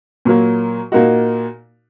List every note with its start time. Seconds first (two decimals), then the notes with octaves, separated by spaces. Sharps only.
0.25 A#2 F#3 A#3
0.92 A#2 A#3 D#4 F#4